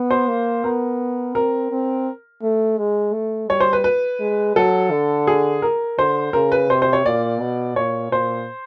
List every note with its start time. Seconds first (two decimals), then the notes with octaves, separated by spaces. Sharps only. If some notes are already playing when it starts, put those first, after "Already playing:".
Already playing: B3
0.11 C5
0.29 A#3
0.64 B3 A#4
1.35 C4 A#4
1.71 C4
2.43 A3
2.78 G#3
3.13 A3
3.49 G3 C#5
3.60 C5
3.73 B4
3.84 B4
4.20 G#3
4.56 F#3 A4
4.91 D3
5.27 G#4
5.62 A#4
5.98 D3 C5
6.33 C#3 A#4
6.52 B4
6.69 C3 C5
6.82 C5
6.93 C#5
7.05 A#2 D5
7.41 B2
7.76 A#2 C#5
8.11 A#2 C5